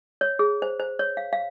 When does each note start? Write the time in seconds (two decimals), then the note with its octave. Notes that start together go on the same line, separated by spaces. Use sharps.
0.21 C#5
0.39 G#4
0.62 C5
0.80 C5
0.99 C#5
1.17 F5
1.33 F5